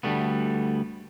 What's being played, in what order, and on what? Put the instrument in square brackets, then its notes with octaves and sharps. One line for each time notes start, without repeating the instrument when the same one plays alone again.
[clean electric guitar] D2 G3 A3 B3